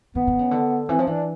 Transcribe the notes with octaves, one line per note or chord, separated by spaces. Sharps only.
D#3 B3
D3
C#3
D3
E3 C4
F3
E3 D4